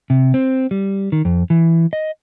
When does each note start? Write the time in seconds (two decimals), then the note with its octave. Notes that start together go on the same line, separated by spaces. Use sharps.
0.10 C3
0.34 C4
0.71 G3
1.12 D#3
1.25 F2
1.50 E3
1.93 D#5